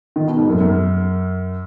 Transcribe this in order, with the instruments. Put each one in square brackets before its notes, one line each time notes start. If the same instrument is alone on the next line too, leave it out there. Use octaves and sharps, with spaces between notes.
[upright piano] D#3
B2
G#2
F#2
F#2